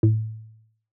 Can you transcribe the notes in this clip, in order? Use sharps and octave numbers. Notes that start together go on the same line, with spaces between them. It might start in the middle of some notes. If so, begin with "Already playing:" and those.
A2